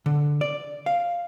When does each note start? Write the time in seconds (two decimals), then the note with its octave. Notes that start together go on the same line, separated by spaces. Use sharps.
0.06 D3
0.41 D5
0.86 F5